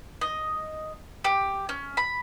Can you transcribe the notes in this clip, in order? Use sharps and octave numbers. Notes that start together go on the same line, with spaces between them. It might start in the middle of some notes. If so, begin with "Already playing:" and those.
D#5
G4
C#4
B5